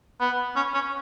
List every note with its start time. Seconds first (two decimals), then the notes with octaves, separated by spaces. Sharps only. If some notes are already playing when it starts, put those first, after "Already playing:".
0.21 B3
0.56 C#4
0.74 C#4